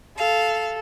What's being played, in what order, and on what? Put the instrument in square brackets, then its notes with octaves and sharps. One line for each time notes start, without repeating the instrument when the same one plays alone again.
[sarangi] A4 [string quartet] F5